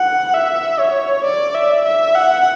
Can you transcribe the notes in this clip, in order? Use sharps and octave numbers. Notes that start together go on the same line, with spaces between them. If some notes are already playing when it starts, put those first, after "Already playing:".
Already playing: F#5
E5
C#5
D5
E5
E5
F#5